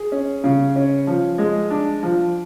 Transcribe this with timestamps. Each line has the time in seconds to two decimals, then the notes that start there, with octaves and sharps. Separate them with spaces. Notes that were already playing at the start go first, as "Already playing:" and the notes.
Already playing: G#4
0.12 C#4
0.44 C#3
0.76 C#4
1.07 F3
1.38 G#3
1.70 D4
2.03 F3